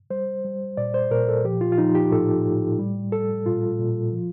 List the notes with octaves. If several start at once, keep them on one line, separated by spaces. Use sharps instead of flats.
G3 C5
G3
A#2 D5
C5
A#2 A#4
A4
F3 G4
F4
F4
F3 D#4
G4
A2 A4
A2
G3
G3 A4
A#2 F4
A#2
F3